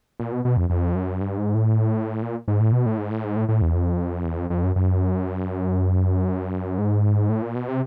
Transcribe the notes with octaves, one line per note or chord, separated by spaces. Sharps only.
A#2
B2
B2
F2
F2
F#2
G2
G#2
A2
A#2
G#2
A2
B2
A2
G#2
A2
G#2
A2
A2
E2
F2
E2
F2
F2
F#2
F#2
G#2
A2
A#2
B2
C3